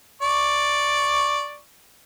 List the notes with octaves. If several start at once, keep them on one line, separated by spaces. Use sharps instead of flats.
D5 C#6